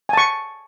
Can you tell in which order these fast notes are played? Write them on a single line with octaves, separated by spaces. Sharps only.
G#5 A5 C#6